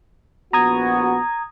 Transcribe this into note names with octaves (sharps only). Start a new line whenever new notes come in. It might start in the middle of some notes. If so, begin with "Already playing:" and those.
A#1 B3 F#4 A#5 D#6 G#6